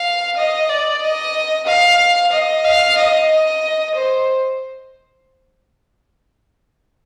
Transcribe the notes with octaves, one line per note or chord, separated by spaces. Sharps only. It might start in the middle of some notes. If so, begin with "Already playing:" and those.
Already playing: F5
D#5
D5
D#5
F5
D#5
F5
D#5
D#5
C5